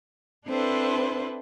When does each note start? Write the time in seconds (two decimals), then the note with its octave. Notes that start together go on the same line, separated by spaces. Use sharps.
0.46 C4 D4 E4 A4 B4 C5